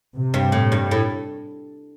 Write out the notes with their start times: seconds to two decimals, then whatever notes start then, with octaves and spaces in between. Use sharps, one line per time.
0.15 C3
0.34 G2
0.52 A2
0.72 G2
0.91 A2